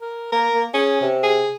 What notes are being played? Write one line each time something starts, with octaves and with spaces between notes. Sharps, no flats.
A#4
A#3 A#4
A#3
C#4 G#4
C3
G#4